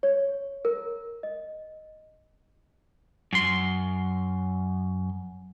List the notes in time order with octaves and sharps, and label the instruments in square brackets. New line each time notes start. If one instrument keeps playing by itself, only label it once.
[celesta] C#5
A#4
D#5
[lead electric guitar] F#2 C6